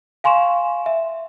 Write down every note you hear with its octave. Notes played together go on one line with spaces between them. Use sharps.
F5 G#5 C6 C#6 E7
E5